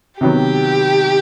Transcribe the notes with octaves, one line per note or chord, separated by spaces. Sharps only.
C3 D#3 F#3 B3 G4